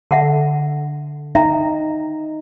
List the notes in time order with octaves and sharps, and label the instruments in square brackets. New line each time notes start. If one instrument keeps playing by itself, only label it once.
[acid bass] D3 [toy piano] E5 F#5 A5
[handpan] D#4 [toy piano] E5 G5 A#5